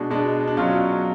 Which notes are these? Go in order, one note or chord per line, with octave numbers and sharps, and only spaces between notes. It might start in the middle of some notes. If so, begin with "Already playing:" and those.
Already playing: B2 G#3 D4
B2 G#3 D4
D4
B2 F#3 C#4 F4